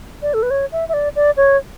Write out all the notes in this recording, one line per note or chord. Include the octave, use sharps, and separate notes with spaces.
D5
A4
B4
C#5
E5
E5
D5
D5
C#5